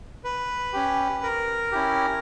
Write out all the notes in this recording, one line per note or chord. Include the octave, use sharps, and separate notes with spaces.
B4
C#4 G4
A#4
C#4 E4 G4